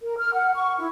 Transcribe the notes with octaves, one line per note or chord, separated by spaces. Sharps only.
A#4
F6
F#5
C#6
E4